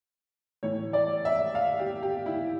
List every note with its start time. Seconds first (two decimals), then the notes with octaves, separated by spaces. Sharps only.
0.63 A2 E3 C#5
0.93 D5
1.25 E5
1.55 F5
1.79 G4
2.03 G4
2.26 E4